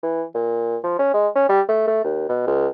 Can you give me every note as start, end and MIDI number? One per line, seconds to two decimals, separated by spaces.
0.03 0.24 52
0.35 0.77 46
0.84 0.99 53
0.99 1.12 61
1.14 1.28 56
1.35 1.47 61
1.49 1.61 55
1.68 1.83 57
1.87 2.01 57
2.04 2.28 39
2.29 2.44 47
2.47 2.68 37